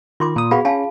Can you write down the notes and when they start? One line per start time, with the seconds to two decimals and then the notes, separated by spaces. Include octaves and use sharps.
0.20 D#3 F4 C6 D6
0.36 A#2 D#6
0.51 B3 F#4 G#4 F5 B5
0.65 C#4 F5 G#5 A5